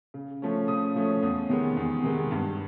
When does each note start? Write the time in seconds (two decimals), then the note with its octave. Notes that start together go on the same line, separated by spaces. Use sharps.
0.14 C#3
0.42 F3 A3 C#4
0.68 C#3 D#6
0.96 F3 A3 C#4
1.22 E2 D#6
1.49 C3 D#3 G#3 B3
1.77 E2
2.03 C3 D#3 G#3 B3
2.31 G2